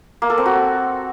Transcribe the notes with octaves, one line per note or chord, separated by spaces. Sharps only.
A#3
A4
C4
F#4